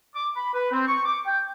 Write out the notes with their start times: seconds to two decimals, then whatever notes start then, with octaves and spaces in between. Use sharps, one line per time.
0.16 D6
0.36 B5
0.55 B4
0.72 C4
0.87 C#6
1.06 D6
1.26 G5